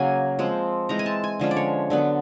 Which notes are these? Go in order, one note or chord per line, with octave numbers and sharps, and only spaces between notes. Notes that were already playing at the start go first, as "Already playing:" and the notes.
Already playing: C#3 F#3 A#3 C#4 G#5
F3 G#3 C4
E3 G#3 C4 A#5
G#5
A5
G#5
D3 F3 G#3 C#4
D5
C#5
D3 F#3 B3